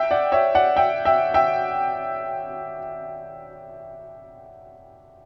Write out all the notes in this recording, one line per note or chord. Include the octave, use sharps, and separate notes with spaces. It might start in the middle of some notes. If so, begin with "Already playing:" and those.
Already playing: E5 G5
D5 F#5
C#5 E5
D5 F#5
E5 G5
E5 G5
E5 G5